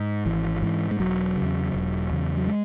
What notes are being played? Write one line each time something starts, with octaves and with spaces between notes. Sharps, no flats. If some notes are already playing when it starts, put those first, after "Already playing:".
Already playing: G#2
G#1 E3
G#2 E3
G#3
E1 F#3
C#3
E2
E1
E2 C#3
F#3
G#3